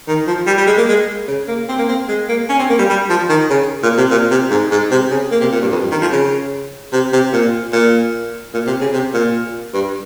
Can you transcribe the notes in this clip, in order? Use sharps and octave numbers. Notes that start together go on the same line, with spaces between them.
D#3
F3
G3
G3
G#3
A#3
G#3
C#3
A#3
C4
A#3
C4
G#3
A#3
C#4
C4
A#3
G3
G3
F3
D#3
C#3
A#2
C3
A#2
C3
G#2
G#2
C3
C#3
A#3
C3
A#2
G2
F2
G2
D#3
F3
C#3
C3
C3
A#2
A#2
A#2
C3
C#3
C3
A#2
G2